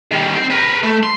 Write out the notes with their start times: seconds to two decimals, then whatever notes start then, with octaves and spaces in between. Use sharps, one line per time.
0.11 D#3 G3
0.36 C4 G5
0.50 A#4 B4
0.83 A3
1.03 C6